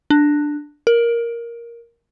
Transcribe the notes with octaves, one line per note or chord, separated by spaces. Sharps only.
D4
A#4